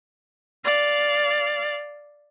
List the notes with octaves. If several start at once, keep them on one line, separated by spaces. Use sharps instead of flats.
D5 F5